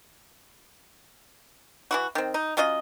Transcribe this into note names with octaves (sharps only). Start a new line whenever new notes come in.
E3 E4 F#4
D#3 C4
D#4
F#3 C#4 F4 D#5